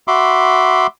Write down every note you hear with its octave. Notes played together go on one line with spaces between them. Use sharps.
F#4 E5 B5 C6 D6